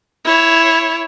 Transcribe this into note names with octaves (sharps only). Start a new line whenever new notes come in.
E4 C#5